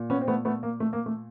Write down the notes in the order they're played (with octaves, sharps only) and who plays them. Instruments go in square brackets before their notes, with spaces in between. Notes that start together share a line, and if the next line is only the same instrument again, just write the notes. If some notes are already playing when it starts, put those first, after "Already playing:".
Already playing: [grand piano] A#2
B3 C#4
C4
A3 B3
A3 B3
A#3
A3
A#3
A3